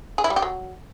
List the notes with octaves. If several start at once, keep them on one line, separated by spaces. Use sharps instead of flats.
G#4
E4
G3
G4
F#3